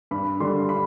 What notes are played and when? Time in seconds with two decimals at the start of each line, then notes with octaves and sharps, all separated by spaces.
0.11 G2 B5
0.40 D3 G3 C6
0.69 B5